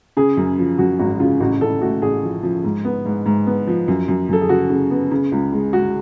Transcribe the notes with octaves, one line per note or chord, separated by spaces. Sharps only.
C#3 G#4
F#2
F3
F#2 F#4
G#1 F#4
C#3 F4
A1 F#4
A1 A4
A2 F#4
A1 G#4
F3
F3
G#2
B3
G#2
G#2
B3
F3
F#2
F#2
F#2 A4
G#4
C#3 F#4
C#3
B3
C#3
C#2
G#3
G#3 F#4